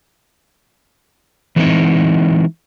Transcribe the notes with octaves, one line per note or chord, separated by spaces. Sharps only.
E3 F#3 G#3 C4 D#4 E4